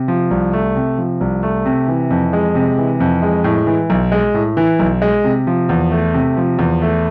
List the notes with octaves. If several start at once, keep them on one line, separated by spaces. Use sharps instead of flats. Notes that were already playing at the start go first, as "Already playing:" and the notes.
Already playing: C3
F3
C2
A3
C3
F3
C2
A3
C3
E3
F2
G#3
C3
E3
F2
G#3
A2
E3
B1
G#3
A2
E3
B1
G#3
C3
F3
E2
A3
C3
F3
E2
A3